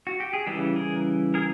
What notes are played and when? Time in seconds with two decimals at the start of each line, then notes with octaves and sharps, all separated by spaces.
0.07 F#4
0.20 G4
0.33 G#4
0.47 C#3 E3 G3 G4 A4
0.76 G#4 A#4
1.34 G#4 A#4